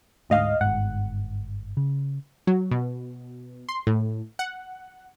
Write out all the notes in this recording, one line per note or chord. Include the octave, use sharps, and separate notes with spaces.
D2 G#2 D#5 F5
G1 G#2 F#5
C#3
F#3
B2
C6
A2
F#5